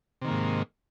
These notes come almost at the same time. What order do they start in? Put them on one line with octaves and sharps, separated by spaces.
C3 D#3 A#3 G#2